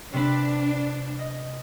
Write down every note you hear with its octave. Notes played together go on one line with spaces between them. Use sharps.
C3 D4 B4
D#5